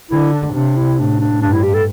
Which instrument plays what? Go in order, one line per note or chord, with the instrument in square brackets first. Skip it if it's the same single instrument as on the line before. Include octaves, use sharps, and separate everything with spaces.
[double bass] D3 [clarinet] E4
[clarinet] D4
[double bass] C3 [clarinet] D4
[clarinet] E4
[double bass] A2 [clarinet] D4
[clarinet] D4
[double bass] G2 [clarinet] D4
[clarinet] E4
G4
A4